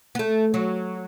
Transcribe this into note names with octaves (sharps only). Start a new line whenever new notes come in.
B3
A3
F#3